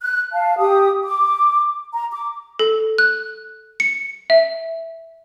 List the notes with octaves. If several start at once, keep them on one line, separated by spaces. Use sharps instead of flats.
F#6
F5 A5
G4 D#6
D6
A#5
D6
A4
F#6
C#7
E5